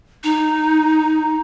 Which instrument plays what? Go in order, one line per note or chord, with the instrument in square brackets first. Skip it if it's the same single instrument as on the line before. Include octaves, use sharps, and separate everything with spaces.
[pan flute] D#4